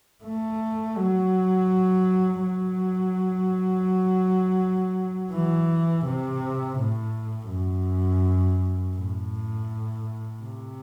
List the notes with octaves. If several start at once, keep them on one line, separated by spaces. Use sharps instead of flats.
A3
F#3
F#3
E3
C3
A2
F#2
A2
C3